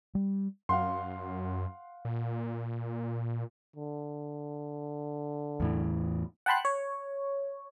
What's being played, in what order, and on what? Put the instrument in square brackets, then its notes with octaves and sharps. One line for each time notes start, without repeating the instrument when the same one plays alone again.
[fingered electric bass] G3
[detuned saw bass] F#2 [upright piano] F5 F#5 C6
[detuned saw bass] A#2
[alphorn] D3
[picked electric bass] E2 A2 E3
[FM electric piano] F#5 G5 A5 B5 C6 F#6
C#5